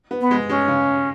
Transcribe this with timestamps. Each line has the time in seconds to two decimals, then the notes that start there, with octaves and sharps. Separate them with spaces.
0.11 B3
0.21 B3
0.31 G#3
0.49 G#3 C#4
0.68 C#3